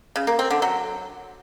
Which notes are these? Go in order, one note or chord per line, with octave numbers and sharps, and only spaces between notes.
C#3
A#3
C4
D3
F#3